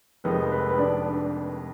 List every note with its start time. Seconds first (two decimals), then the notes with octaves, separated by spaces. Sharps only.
0.24 F1 F2 D#3 G#3 D#4 B4
0.52 B4
0.69 B4
0.78 D4 D5